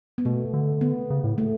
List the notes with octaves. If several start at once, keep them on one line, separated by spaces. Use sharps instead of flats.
B3
B2 A3
D3
B3
C#3
A2
A3